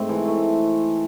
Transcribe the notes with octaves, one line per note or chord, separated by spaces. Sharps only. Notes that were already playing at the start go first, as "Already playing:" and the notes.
Already playing: G#2 A3 C4
E3
A3